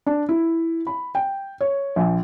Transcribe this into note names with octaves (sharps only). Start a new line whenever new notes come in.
D4
E4
B5
G5
C#5
A#1